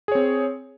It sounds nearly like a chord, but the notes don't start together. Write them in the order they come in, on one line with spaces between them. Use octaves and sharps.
G#4 C#5 C4